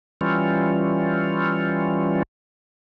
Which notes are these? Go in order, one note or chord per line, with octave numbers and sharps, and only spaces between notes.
E3 G3 C#4 F4